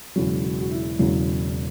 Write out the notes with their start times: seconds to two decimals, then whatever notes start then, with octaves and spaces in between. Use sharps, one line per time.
0.16 E1 E2 C#3 F#3 F#4
0.44 F#4
0.61 F#4
0.71 E4
0.99 E1 E2 C#3 F#3